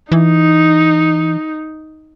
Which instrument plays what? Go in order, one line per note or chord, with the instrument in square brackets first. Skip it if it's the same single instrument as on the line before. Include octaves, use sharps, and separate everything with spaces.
[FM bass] E3 [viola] D#4